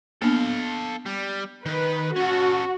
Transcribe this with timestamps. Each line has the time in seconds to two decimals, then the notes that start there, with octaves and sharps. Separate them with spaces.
0.22 A#3 B3 D4 A4 F5
1.06 G3
1.66 D#3 B4
2.16 C#4 F#4 A4